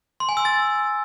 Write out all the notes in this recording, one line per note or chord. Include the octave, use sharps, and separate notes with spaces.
C6
G#5
E6
A6